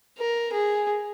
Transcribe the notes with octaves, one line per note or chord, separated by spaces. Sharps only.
A#4
G#4